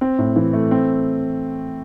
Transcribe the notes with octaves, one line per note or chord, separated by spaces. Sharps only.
C4
A2
E3
A3
C4